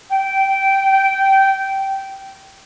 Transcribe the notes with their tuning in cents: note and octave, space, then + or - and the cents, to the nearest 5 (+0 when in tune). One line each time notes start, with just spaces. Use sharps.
G5 -15